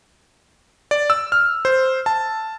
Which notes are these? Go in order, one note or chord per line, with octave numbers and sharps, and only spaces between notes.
D5
E6
F6
C5
A5